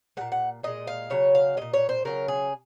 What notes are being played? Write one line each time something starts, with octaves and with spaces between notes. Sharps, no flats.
A#2 G#3 F#5
F#5
A#2 G#3 D#5
F5
C#3 F#3 C#5
F5
A#2 G#3 D#5
C#5
C5
C#3 F#3 A#4
G#4